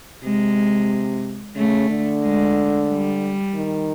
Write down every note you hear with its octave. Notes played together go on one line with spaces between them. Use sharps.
C3 G#3
C#3 A3
D3
G#3
G3
D#3